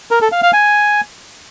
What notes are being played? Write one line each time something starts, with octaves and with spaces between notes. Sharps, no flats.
A#4
A4
F5
F5
G#5